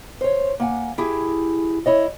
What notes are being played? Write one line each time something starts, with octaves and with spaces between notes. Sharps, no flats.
C5 C#5
A#3 F#5 G#5
E4 G4 G#4
E4 C#5 D#5